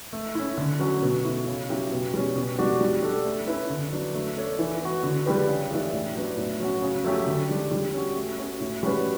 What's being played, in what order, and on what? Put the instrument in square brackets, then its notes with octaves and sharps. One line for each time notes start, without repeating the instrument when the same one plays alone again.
[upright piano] A3
C#4 E4
D3
F#3 C#4 F#4 C#5
B2
A3 E4
C#3
F#3 C#4 E4 G4
B2
G3 C#4
B2
G3 D4 F#4
G3
D4 A4
A3
C#4 E4 B4
D3
F#3 B3 D4
A3
D4 A4 C#5
E3
B3 F#4
D3
G3 D4 G4 B4
C#3
E3 A3 D4 G4
A2
F#3 B3 D4
A2
F#3 C#4 F#4
C#3
F#3 A3 C#4 G4
D3
G3 D4
G3
C#4 F#4
A3
C#4 F#4 C#5
A2
G3 C#4 F#4 B4